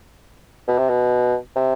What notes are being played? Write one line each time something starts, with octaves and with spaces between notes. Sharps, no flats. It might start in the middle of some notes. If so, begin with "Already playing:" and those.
B2
C3
B2
C3